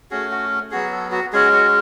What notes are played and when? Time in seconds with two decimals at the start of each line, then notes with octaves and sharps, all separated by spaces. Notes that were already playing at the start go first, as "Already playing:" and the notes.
0.11 A3 C#4 F#4 G#4
0.31 F#4
0.71 F#3 B3 F#4 G#4
0.92 A4
1.12 F#4
1.33 G#3 C#4 F#4 G#4
1.53 F#4